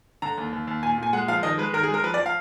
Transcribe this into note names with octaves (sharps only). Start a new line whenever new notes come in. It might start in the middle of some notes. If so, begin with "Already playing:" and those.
D3 A#5
D#2
D#2
D#2
A#2 G#5
A#2 G#5
G#3 F#5
F3 F5
D#3 D#5
G#3 B4
D#3 A#4
G#4
G#3
A#4
F3 B4
D5
F3
F5